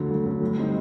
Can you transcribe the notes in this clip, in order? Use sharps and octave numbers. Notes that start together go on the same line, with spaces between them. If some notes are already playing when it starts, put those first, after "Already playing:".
Already playing: D2 D3 F#3
D2
D3 F#3
A2
G3 C4 D#4